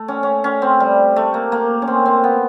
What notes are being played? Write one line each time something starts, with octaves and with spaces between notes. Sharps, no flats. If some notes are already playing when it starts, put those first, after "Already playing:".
Already playing: A3
C#4
C#4
C#4
C4
G3
A3
A#3
A#3
C#4
C4
C4
B3